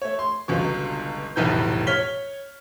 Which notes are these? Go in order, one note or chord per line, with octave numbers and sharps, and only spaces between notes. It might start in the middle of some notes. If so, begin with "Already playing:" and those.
A3 C#5
C6
G1 C#2 B2
F1 B1 E2 A2 B4 G6
C#5 F6 B6 G7